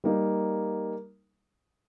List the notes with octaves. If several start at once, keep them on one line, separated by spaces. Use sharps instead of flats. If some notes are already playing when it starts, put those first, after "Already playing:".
G3 A#3 D#4 A#4